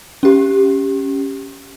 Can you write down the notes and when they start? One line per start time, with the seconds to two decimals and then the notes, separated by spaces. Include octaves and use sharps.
0.23 C#4 G4